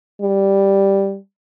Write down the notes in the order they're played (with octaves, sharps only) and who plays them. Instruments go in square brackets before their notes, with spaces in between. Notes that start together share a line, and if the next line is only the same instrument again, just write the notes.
[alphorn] G3